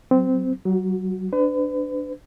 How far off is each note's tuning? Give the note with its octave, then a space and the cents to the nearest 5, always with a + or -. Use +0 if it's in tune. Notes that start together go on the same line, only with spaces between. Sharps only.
F#3 +20 C4 -15
F#3 +35 F#4 -15
D4 +0 B4 +40